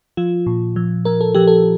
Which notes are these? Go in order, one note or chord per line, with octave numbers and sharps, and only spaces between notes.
F3 F4
A#2
F3
F3 A#4
A4
F3 G4
A4